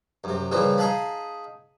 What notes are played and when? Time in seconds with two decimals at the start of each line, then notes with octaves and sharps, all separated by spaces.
0.24 F#2 C3
0.51 A#2 C#3 E3 F3 G3
0.78 D#4 G#4 F5 A5 B5